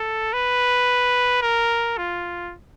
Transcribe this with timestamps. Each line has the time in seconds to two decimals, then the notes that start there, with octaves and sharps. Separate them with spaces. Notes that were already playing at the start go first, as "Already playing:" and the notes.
Already playing: A4
0.33 B4
1.42 A#4
1.97 F4